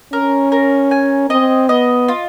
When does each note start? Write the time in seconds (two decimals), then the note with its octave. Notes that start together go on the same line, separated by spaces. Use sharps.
0.13 C#4 A#4
0.52 A#4
0.91 G#5
1.30 C4 D#5
1.69 B3 D#5
2.08 F4